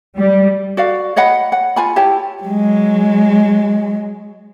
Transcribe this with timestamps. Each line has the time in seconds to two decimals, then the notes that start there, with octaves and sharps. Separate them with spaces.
0.16 G3
0.77 F#4 D5 F5
1.16 C#5 D#5 F#5 B5
1.52 F#5
1.76 F4 G#5 B5
1.96 E4 G4 C#5 A5
2.43 F#3 G#3